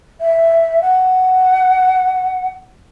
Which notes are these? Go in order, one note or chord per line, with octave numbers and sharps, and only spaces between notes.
E5
F#5